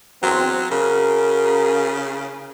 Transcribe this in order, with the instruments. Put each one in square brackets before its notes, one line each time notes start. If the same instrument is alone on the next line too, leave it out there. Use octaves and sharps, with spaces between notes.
[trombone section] E2 C4 [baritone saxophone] F#3
[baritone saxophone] C#3 [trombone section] F#4 A#4